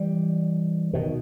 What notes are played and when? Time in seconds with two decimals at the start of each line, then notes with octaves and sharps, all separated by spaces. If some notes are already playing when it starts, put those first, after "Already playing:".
Already playing: E3 G3
0.93 B2 D#3